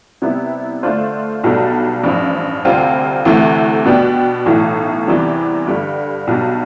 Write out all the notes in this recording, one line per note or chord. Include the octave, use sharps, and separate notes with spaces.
C3 G3 B3 E4
D3 A3 D4 F4 C5
B1 B2 G3 D4 A4
A1 G2 F3
D2 C3 G3 C4 F4
D2 C3 E3 A3
B2 B3 D4 G4
B1 A2 E3
E2 C3 E3 G3
G2 D3 G3
B1 B2 G3 D4